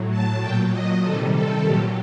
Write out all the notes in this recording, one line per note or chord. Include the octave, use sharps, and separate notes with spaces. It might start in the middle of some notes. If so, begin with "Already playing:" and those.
Already playing: A2 F#3
A5
A#2 F#3 G5
D#5
C3 D#3 G3 A4
A4
A#2 F#3 G4